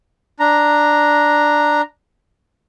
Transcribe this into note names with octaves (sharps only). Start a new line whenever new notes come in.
D4 A#5